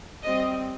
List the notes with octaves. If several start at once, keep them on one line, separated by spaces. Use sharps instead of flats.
G3 C4 D#5